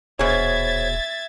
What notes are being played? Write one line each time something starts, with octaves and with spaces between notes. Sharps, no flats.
D#1 B2 G#4 C5 C#5 E5 G#6 A6